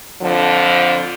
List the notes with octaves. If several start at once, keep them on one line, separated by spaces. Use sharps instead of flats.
F2 D3 F3